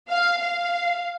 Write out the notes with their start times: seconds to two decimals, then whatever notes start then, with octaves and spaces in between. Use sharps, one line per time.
0.10 F5
0.39 F5